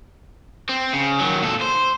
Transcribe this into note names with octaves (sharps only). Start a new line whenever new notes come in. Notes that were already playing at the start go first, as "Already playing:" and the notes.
C4
C#3
D#3 F#3
A#2 A4
C5